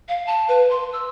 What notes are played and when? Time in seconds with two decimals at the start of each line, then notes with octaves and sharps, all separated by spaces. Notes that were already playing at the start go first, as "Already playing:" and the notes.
0.09 F5
0.27 A5
0.49 B4
0.71 C6
0.93 E6